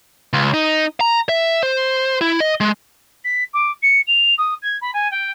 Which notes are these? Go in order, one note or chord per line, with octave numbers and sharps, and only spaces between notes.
C#2
D#4
A#5
E5
C5
E4
D#5
G#3
B6
D6
C#7
F7
D#6
G#6
B5
G#5
G5